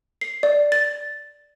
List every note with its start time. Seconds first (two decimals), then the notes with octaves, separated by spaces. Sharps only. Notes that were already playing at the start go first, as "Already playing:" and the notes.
0.21 C7
0.43 D5
0.72 A6